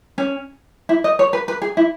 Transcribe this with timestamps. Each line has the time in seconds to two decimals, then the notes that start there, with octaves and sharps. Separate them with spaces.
0.18 C#4
0.89 E4
1.04 D#5
1.19 C#5
1.33 B4
1.48 B4
1.62 G#4
1.77 E4